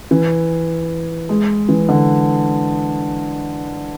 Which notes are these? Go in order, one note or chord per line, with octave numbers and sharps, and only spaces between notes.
E3
G#3
E3
D3